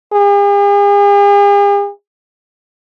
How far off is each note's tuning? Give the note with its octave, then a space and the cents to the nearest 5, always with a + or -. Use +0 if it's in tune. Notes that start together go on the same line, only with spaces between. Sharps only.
G#4 -45